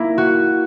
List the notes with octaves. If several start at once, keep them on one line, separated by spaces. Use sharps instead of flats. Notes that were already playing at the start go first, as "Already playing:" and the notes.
Already playing: A#3 E4
F#4